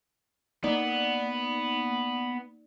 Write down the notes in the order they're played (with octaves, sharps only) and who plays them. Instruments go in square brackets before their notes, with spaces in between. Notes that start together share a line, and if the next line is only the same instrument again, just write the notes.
[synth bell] A#3 D#4 D5 [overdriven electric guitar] B3